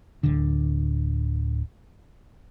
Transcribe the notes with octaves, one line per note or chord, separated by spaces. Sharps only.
D1 D3